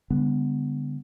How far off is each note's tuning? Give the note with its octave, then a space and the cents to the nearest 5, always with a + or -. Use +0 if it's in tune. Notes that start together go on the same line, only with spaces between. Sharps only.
D3 -20 G3 +45 B3 +0